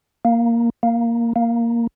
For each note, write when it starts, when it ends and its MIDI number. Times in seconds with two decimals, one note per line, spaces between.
0.25 0.70 58
0.83 1.33 58
1.36 1.87 58